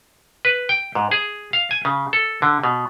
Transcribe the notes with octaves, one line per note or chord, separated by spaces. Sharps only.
B4
G5
G#2
G#4
F5
G#5
C#3
A4
D3
B2